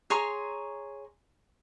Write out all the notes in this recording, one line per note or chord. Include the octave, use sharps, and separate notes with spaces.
G#4 C#5 A#5 C6